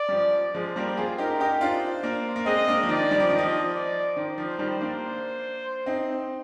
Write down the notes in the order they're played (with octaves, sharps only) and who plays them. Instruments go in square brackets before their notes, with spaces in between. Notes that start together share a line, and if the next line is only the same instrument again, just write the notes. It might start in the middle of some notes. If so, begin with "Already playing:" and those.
Already playing: [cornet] D5
[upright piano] G3
F3
F3 G#3
[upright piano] G3 A#3 [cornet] C5
[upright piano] F4 G#4
[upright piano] D#4 G4 [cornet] A#4
[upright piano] D#4 G4
[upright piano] D4 F4 [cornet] C5
[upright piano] A#3 D4
A#3
[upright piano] G#3 C4 [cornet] D#5
[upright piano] A#3 D4
F3
[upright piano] D#3 [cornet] D5
[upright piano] G3
F3
[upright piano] D#3 [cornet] D#5
[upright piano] F3
[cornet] D5
[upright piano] D#3 [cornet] C5
[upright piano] F3
D#3 G3
A#3 D4
C4 D#4